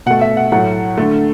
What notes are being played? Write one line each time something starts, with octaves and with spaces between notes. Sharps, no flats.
B2 A3 F#5
E5
F#5
A2 F#3 A3 F#5
D3 A3